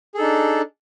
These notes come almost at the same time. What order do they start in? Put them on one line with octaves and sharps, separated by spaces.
G#4 A4 D#4 D4